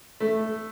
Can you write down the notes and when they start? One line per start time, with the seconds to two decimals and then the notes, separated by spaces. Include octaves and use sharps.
0.20 A3